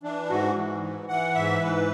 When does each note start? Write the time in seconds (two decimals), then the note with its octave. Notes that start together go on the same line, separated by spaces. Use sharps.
0.03 E3 D4
0.30 G#2 F#4
0.56 E3
0.83 E3
1.09 E3 F#5
1.35 G#2 E5
1.61 G#2 B4